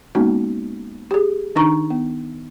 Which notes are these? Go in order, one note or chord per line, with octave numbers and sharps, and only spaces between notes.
G#3 A#3 B3 C#4 D#4 F#4
G4 G#4
D#3 D4 D#4 A#5 C#6
B3